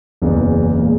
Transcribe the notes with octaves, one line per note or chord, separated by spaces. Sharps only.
F#1 E2 C#3
A#2 G#3